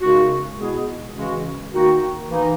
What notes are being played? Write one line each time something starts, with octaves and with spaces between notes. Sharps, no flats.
F#2 C#3 G#3 D#4 F#4
B2 G#3 B3 E4 G#4
C#3 E3 G#3 C#4 F#4
D#3 A#3 D#4 F#4
E3 A#3 D#4